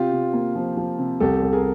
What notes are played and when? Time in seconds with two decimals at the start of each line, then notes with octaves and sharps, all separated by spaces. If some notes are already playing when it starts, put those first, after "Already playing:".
Already playing: C3 F4 G4
0.12 C3
0.33 A#3
0.55 F3
0.77 F3
0.99 C3
1.20 C2 G4 A4
1.42 C2
1.53 G#4 A#4